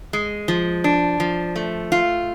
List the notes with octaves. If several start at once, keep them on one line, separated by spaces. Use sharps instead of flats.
G#3
F3
D4
F3
A3
F4